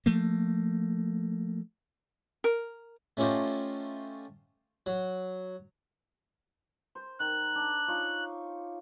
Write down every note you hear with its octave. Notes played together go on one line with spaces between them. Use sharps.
F3 A3 A#3
A#4
A3 C#4 F4 G4 C5 D#5
F#3
C5
D#3 F#6
D4
D#4 F4 C#5